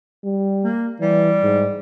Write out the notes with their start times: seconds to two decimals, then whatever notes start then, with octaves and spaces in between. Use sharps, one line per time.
0.24 G3
0.64 A#3
1.00 E3 G3
1.43 G#2